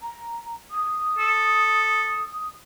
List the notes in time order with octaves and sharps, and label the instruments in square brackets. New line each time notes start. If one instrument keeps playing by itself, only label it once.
[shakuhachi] A#5
D#6
[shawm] A4